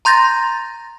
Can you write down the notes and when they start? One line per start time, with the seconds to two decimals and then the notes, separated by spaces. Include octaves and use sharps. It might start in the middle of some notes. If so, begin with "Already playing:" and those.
0.05 A#5 C6 G6 A6 A#6